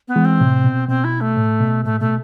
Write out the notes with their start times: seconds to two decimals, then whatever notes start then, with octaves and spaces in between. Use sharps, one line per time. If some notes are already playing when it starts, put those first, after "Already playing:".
0.08 B3
0.16 E3 G#3
0.25 C4
0.40 A2 C3
0.64 B2
0.89 B2 C4
1.04 E4
1.21 A3
1.37 A2
1.60 B2
1.85 A2 A3
2.00 B2 A3